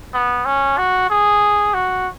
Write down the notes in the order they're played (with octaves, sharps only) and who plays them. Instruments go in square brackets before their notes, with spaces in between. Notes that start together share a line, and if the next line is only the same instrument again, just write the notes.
[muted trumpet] B3
C#4
F#4
G#4
F#4